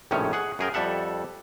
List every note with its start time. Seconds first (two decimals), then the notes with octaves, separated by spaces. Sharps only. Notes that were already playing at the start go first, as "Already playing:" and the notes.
0.11 A#1 A2 C3 D#3 C#4 C#5
0.33 G#4 F#5
0.59 F#2 G#4 A#4 G5
0.74 F2 G3 A4 E5 F#5